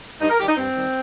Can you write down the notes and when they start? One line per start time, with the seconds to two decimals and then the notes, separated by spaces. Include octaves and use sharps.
0.20 G2 D#4
0.29 A#4
0.39 D#3 G3 G4
0.48 D#4
0.57 G2 C4
0.75 D#3 G3